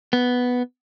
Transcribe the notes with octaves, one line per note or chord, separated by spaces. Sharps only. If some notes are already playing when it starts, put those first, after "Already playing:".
B3